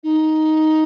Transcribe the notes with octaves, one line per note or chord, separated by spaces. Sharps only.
D#4